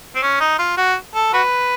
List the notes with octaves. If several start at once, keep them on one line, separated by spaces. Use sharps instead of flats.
C4
C#4
D#4
F4
F#4
A4
F#4 B4